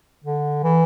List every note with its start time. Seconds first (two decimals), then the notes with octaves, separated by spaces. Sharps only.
0.24 D3
0.64 E3